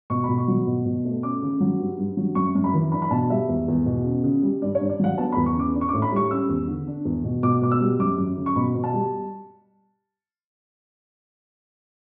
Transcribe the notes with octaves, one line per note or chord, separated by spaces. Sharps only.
B2 C#6
B2 B5
C#6
F#3
B2
B2
A3
C#4 D6
C#3
F#3
G2
G2
F#3
F#2 C#6
F#2
B5
E3
D4 B5
B5
B2 A5
G3 E5
E2
E2
B2
C#3
C#3
G3
G2 D5
C#5
G2
D5
F#3 F#5
B3 A5
B5
E2
C#6
C#3 D6
D4
C#6
D6
A2
B5
G3 C#6
C#4 E6
E2
D3
D4
E2
B2
B2 D6
B2 D6
E6
G3
F#2 D6
F#2
C#3
C#6
B2 B5
B2
A5
G3